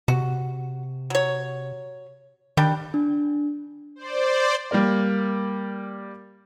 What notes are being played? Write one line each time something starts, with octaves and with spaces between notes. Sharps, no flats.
C3 F#4
F#3 C#5
D#3 G3 D4 G5
D4
C5 D5
G3 A#3 A#4 D5